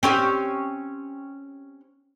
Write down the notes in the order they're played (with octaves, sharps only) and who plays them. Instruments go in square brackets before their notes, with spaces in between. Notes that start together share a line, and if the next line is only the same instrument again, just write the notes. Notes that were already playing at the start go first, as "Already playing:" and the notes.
[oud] C4 C#4 G4